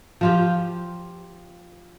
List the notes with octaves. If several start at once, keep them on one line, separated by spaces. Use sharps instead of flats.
F3 F4 G4